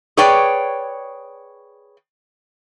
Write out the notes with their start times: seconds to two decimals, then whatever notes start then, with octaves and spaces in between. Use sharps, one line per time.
0.17 G#4 B4 C#5 D5 G5